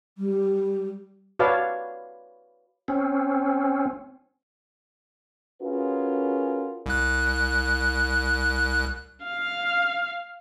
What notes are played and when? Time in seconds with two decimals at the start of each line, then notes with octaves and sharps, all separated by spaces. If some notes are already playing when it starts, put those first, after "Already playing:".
0.18 G3
1.39 F#4 B4 C#5 D5 F5 A5
2.88 C4 C#4
5.62 C#4 F4 F#4 G#4 A#4 B4
6.86 C2 F#6
9.23 F5